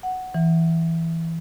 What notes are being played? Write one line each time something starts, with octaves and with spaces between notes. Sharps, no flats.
F#5
E3